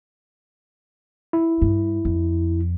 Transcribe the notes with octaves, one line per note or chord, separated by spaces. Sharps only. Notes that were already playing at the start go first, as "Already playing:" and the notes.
E4
G2
F2